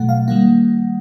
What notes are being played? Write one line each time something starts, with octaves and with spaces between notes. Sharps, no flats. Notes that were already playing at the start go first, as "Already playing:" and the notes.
Already playing: B2 F#3 A3 F#5
F5
D#3 G3 A#3 F#5